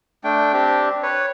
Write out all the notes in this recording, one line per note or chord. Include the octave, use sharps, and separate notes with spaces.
A3 D4 G5
C4 D4 G4
B4 C#5